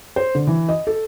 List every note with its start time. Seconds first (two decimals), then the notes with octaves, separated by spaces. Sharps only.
0.16 C5
0.35 D3
0.47 E3
0.69 D#5
0.87 A4